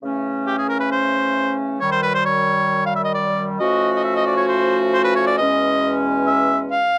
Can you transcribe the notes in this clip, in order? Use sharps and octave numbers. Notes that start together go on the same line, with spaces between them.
C#3 E3 A3 C#4
G4
G#4
A#4
B4
C5
F#2 D#3 G3 C#5
C5
B4
C5
C#5
F5
E5
D#5
D5
A2 F3 A3 C#4 F#4 D#5
D#5
E5
D#5
D5
C#5
C5
C5
B4
C#5
D5
E2 B2 G#3 C#4 D#5
E5
F5